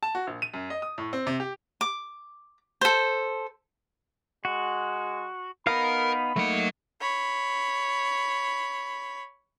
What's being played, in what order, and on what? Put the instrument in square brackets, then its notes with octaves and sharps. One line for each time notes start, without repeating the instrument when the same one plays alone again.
[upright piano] A5
F#4
A#1
D#7
F#2
D#5
D#6
A2
C4
C3
G4
[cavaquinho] D6
A4 C5
[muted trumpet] G#3 [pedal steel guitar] F#4
[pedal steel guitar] B3 D#4 F5 [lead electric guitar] A#4 [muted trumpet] B5
[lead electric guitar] F#3 F#5 [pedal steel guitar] A3 A#3 D#4
[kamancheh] C#5 B5